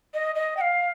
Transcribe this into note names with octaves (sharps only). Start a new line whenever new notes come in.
D#5
D#5
G5
F5